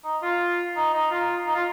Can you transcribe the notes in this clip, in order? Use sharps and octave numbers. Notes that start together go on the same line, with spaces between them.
D#4
F4
D#4
D#4
F4
D#4
F4